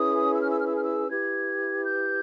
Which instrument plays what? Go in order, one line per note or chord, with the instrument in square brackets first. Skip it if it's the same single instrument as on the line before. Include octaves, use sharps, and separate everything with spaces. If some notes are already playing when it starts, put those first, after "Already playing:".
Already playing: [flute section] C#4 E4 G#4 B4 D#6
E6
F6
E6
F6
E6
F6
E6
E4 G4 B4 G#6
G6